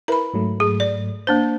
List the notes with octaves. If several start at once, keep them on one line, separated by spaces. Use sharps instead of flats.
E4 A#4 B4 A#5 B5
G#2 F#3 A3
G#4
D5
A#3 D4 C5